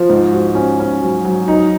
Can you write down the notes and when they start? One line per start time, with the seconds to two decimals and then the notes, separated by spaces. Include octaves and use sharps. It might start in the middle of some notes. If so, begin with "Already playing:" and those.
Already playing: F3
0.09 G#2
0.33 F#4
0.55 C#4
0.79 C#4
1.02 F#3
1.25 F#3
1.48 D#4